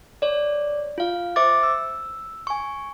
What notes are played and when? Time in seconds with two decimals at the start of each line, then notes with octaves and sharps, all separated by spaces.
0.22 C#5 D5
0.98 F4 F5
1.36 C5 E5 D6 A6
1.63 E6
2.47 G#5 C#6